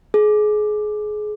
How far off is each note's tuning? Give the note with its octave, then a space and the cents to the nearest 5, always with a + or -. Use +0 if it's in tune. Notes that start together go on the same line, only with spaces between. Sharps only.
G#4 +25